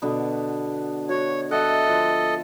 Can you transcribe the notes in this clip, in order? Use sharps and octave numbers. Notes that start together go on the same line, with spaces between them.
B2 D3 B3
F#4 C#5
A4 D#5 E5 F#5
F3